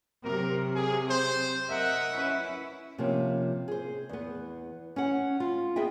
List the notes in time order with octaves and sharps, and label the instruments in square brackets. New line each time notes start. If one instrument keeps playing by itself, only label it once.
[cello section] C3 F#3 [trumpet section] A#4
[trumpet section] G#4
C5
[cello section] A#4 D#5 [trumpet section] E5 F#5
[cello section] C#4 E4 B4
[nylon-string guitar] C3 F3 A#3 C#4
G#4 C5
E2 B3
C#4 F#5
F4
B3 G#4 D#5 E5 G5